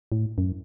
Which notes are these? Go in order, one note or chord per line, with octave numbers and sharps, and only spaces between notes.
A2
F#2